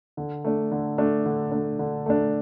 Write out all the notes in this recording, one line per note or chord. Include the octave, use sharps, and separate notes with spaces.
D3
A3 D4
D3
A3 D4
D3
A3 D4
D3
A3 D4